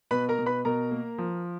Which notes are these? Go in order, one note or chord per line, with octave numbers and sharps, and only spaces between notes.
B2 B4 B5
A#4 A#5
B2
B4 B5
B2 A#4 A#5
A#3
F3